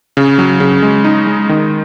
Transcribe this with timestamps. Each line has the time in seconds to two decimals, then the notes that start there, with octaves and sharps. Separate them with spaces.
0.17 C#3
0.38 F#3
0.60 C#3
0.83 G#3
1.04 D#4
1.27 G#3
1.49 D#3